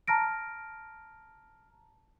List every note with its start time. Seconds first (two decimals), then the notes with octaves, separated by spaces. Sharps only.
0.08 A5 A#5 F6 A#6 D7